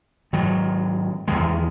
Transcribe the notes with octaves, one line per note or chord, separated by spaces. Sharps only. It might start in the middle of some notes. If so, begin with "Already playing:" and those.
G#2 D#3 F#3
E2 D#3 G#3